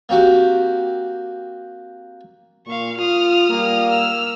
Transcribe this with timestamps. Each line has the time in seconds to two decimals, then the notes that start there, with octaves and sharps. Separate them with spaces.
0.09 A#3 C4 F#4 G4
2.67 A#2 F5 C#6
2.98 F4 D#6 F6
3.49 G3 A#3
3.90 E6 F6